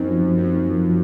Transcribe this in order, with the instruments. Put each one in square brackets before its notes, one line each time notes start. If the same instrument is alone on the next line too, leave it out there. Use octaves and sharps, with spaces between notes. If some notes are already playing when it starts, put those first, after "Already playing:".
Already playing: [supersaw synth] F#2 [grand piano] C4 D#4
[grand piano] F3
F3
[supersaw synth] F#2 [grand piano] C4
[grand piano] D#4
F3
F3